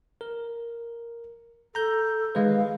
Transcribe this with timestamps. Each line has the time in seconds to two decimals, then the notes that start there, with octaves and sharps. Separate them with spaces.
0.21 A#4
1.75 A4 A#5 G6
2.35 D#3 G#3 B4 F5